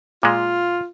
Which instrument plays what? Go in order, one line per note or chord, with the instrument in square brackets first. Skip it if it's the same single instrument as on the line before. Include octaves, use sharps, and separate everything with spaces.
[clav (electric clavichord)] A#2 G#3 [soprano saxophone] F4